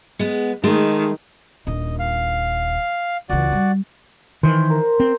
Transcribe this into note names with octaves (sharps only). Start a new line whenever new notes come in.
G#3 B3
D#3 G#3 A3
D#1 D4 D#5
F5
C#2 E3 F#4 D5
G3
D#3 E3 C5
A#4
C4